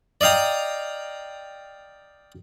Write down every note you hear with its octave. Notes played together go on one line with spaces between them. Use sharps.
D5 D#5 F5 G5 A#5